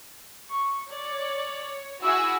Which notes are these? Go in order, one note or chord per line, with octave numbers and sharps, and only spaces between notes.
C#6
C#5 D5
E4 F#4 G#4 E6